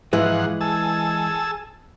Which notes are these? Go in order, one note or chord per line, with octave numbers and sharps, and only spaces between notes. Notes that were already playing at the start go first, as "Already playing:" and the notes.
G#2 E3 F3 G#3 F#5
G#4 A5 E6